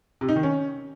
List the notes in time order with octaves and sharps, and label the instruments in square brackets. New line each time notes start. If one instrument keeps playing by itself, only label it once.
[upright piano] C3
D#4
D#3
C#4